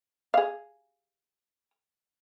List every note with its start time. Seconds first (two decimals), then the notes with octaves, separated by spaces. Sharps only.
0.34 G#4 F5